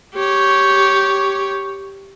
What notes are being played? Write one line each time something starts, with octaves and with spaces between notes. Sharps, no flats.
G4 C#5